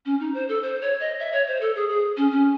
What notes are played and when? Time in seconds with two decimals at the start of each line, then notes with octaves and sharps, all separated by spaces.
0.05 C#4
0.20 D#4
0.34 C5
0.49 A4
0.63 C5
0.81 C#5
1.00 D#5
1.19 E5
1.32 C#5
1.47 C5
1.61 A4
1.75 G#4
1.89 G#4
2.17 C#4
2.32 C#4